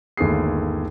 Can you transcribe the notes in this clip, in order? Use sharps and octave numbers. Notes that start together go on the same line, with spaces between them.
G1 D#2 A3 G#4 C7